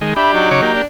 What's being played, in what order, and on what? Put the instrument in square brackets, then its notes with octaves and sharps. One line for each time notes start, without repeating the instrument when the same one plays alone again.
[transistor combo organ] D#3 G#3
[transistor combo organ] D4 G4 [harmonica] E5 B5
[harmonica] F#3 D#4
[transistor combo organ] C#3 C#5 D6
A#3 G4
[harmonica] D4